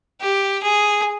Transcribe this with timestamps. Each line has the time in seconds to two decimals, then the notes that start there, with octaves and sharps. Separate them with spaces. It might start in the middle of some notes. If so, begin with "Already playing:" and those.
0.21 G4
0.63 G#4